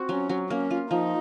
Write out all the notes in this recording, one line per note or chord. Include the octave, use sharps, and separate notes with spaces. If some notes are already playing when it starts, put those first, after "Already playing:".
Already playing: C4 F#4
F#3 C#4
F#3
A#3 C#4
F4
F3 D#4